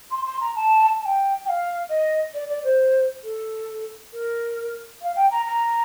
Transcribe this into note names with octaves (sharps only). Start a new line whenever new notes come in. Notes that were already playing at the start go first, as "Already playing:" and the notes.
C6
C6
A#5
A5
A5
G5
G5
F5
D#5
D5
D5
C5
A4
A#4
F5
G5
A#5
A#5